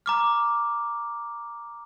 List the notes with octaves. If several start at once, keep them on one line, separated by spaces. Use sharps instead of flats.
A#5 D6 F6